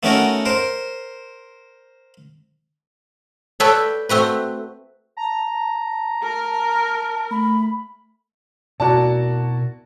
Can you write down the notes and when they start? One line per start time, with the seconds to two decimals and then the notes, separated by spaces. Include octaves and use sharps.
0.03 A3 B3 C#4 D#4 F#4 A#4
0.45 A#4 C5
3.60 A4 B4 C#5 D5 G5 A5
4.09 A3 C4 F#4 B4
5.17 A5 A#5
6.22 A#4
7.31 A3 B5
8.80 B2 E4 F#4 A#4 D5 A5